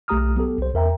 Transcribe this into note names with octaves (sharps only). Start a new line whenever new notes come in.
B1 A3 G4 A#5 D#6 F6
F#3 B3 G4 A4
C2 C5
E2 A#4 E5 G5 A#5